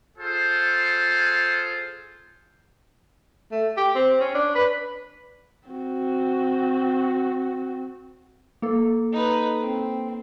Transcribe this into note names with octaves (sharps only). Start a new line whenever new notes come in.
F4 G#4 A4 C5
A3
G4
C4
C#4
D4
B4
C4 F#4
A#3 A4
D#4 B4
C4